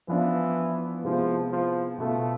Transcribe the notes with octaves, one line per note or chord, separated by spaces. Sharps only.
E3 F3 B3 D4 F4
C3 F3 G#3 B3 E4
F3
B2 A3 B3 F4